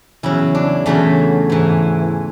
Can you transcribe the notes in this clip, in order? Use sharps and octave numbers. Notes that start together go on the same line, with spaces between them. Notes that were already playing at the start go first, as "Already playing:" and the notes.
E2 C#3 F#3 E4
D4
E2 C#3 F#3 A3
G#2 E3